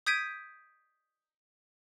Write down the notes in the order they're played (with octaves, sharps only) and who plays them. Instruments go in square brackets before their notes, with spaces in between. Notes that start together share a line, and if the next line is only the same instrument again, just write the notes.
[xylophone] D#6 G6 G#6 B6 D7 D#7